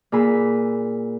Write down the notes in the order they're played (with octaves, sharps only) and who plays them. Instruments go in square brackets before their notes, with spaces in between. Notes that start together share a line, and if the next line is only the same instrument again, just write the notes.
[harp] A#2 G#4 B5 E6